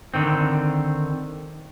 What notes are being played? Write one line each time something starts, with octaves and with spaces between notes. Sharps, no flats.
D3 D#3 C4